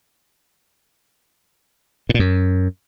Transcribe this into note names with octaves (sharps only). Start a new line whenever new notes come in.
A2
A#2
F#2